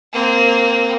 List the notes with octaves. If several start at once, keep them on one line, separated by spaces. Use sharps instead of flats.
A#3 C4